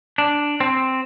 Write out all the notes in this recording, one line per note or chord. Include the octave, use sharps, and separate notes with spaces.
D4
C4